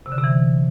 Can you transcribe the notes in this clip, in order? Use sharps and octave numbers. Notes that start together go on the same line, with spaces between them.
C3
D3
C3
E3